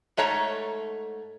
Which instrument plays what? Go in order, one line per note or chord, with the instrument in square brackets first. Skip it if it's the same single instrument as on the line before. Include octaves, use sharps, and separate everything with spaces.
[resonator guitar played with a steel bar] G#2 A3 C#5 A5 A#5